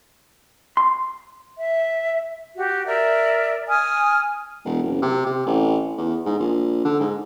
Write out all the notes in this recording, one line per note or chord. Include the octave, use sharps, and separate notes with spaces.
C6
E5
F#4 G4
A#4 D5 E5
G#5 D#6 F6
E1
F#1
C3
C3
A1
E2
G#2
A#1
D3
G#2